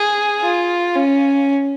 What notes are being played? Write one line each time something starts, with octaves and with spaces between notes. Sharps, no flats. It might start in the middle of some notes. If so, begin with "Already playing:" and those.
Already playing: G#4
F4
C#4